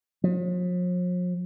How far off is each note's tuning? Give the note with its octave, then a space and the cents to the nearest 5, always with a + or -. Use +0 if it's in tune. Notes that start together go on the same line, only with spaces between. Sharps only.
F3 +45